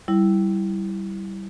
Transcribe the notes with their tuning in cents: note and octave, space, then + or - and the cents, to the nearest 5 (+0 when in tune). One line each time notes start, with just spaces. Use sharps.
G3 -15 E4 +0